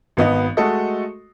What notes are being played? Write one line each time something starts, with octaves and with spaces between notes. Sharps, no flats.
G#1 B3 D#5
G#3 A3 F#4 A4 D#5